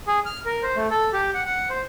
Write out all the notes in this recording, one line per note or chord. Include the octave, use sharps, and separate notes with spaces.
G#4
F6
A#4
C5
A3
A4
G4
F#5
F#5
C5